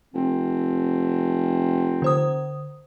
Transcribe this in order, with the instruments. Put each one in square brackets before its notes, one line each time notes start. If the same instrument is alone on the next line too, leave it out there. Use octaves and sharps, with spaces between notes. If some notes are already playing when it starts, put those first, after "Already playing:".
[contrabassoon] F1 [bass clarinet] C4
[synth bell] D3 C5 D#6